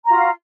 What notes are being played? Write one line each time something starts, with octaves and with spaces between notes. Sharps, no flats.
F4 F#4 F5 A#5